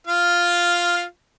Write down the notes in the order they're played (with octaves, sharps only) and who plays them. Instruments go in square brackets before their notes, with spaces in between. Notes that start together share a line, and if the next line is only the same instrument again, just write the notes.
[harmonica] F4 F5